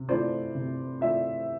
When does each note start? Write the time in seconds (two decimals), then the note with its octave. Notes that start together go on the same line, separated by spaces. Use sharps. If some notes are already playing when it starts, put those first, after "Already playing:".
Already playing: C3
0.08 E3 A3 D4 F4 C5 D5
0.55 C3
1.01 E3 A3 D4 F4 D5 E5